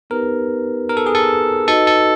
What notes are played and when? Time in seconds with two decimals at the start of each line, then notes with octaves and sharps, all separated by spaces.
0.10 B3 D#4 G4 A#4 B4
0.89 A#4
0.97 A4
1.06 G#4
1.15 A4
1.67 D#4 F#4 A4 B4 D#5
1.87 A4